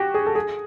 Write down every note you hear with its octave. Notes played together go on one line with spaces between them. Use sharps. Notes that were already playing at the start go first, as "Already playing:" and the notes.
Already playing: F#4 G4
G#4
A4
G#4